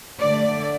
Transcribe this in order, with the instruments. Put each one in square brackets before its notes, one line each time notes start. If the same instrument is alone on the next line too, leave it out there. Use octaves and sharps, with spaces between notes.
[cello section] D3 A3 D5